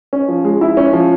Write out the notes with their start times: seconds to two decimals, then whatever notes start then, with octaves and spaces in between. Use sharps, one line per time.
0.13 C#4
0.28 F3
0.45 G#3
0.61 E4
0.77 C#4
0.93 F3